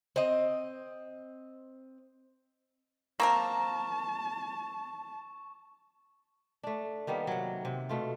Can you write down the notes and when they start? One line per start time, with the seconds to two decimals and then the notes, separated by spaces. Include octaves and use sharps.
0.16 C4 D#5
3.20 A#3 C4 A#4 A5 C#6
6.63 A3 D4
7.07 D#3 G3 A#3 B3
7.27 C3 F#3
7.65 C3
7.89 B2 A3 F4